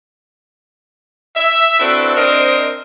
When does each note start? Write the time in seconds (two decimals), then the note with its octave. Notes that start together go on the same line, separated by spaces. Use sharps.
1.36 E5
1.80 C4 D4 E4 F#4 A4 B4
2.17 C4 D4 A#4 C5 D#5